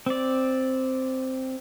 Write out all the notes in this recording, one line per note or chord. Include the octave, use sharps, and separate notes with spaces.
C4 D5